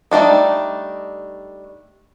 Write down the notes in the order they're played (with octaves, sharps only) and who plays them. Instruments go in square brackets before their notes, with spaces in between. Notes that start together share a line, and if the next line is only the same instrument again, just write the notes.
[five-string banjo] G3 A3 D4 D#4